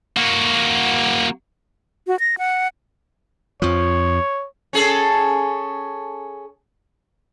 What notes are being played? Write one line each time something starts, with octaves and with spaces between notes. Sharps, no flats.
A#3 F#4
F#4
A#6
F#5
F2 F3 C#5
C#4 G#4 A4